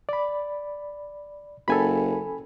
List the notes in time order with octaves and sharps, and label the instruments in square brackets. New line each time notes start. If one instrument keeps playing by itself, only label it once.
[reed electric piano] D5 B5
[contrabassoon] F#1 [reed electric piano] A4 G#5 B5